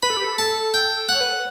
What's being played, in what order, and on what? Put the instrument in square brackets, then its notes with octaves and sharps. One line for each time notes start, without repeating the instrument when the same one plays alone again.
[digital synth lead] B4 [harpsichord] B5
[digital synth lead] A4
G4
A4
[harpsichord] A5
G5
[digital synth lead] C#5 [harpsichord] F#5
[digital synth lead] B4
A4